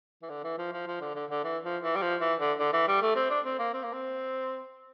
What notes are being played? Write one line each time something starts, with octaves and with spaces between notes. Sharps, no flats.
E3
D3
E3
F3
F3
F3
D3
D3
D3
E3
F3
E3
G3
F3
E3
D3
D3
E3
G3
A3
C4
D4
C4
A#3
C4
A#3
C4